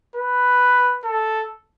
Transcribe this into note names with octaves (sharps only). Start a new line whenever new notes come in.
B4
A4